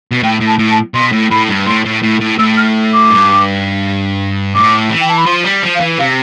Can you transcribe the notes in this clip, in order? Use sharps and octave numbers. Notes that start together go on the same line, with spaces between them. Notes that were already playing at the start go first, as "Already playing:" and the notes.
B2
A2 G5
A2
A5
A2
A5
B2 C6
A2
A2 B5
G2
A2 C6
A2
A2
A2
A2 E6
F6
D6
G2
A2 D6
E3
G5
A5
B5
F3 C6
G3
F3
F5
E3
C3 F5